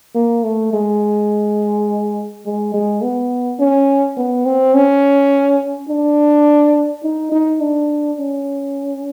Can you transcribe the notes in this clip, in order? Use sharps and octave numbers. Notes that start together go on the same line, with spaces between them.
A#3
A3
G#3
G#3
G#3
B3
C#4
B3
C4
C#4
D4
D#4
D#4
D4
C#4